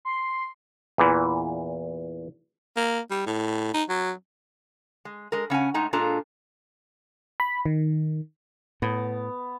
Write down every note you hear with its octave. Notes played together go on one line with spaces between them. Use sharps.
C6
E2 A#2 E3
A#3
G3
A2
D#4
F#3
G#3
G#3 A#4
C#3 C#4 F#5 G#5
A2 G#3 D#4 G#5 A#5
A#2 G#3 D4 F4 A4 A#5
B5
D#3
A2 B3